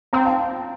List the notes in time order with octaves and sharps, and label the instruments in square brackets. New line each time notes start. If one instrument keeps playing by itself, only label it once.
[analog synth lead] C4 [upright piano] G5 A#5
[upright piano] F5 A5